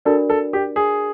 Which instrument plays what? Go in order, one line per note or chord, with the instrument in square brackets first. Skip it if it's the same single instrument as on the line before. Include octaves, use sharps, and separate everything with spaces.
[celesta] D4 F#4 A#4 D5 [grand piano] A4
[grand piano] A4
G4
G#4